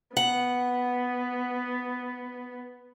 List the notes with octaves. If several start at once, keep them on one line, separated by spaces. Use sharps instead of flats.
B3 F#5